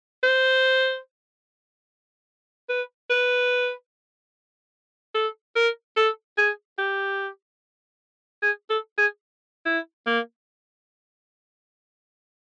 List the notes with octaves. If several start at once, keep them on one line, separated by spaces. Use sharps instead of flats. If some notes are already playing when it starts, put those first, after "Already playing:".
C5
B4
B4
A4
A#4
A4
G#4
G4
G#4
A4
G#4
E4
A#3